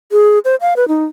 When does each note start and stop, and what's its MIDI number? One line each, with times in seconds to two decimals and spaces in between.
0.12 0.39 68
0.45 0.56 72
0.61 0.74 77
0.76 0.88 71
0.88 1.05 63